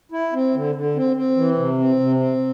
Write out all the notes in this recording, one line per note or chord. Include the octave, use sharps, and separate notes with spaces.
E4
C4
D3
D3
C4
C4
E3
C3
C4
C3
C4